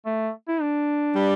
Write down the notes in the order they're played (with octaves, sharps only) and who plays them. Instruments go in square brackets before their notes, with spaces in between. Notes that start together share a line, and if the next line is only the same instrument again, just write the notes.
[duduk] A3
E4
D4
[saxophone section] G3